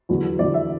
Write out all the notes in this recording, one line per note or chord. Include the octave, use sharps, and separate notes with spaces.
E2 D3 F#3
E2 D3 F#3 D5
E5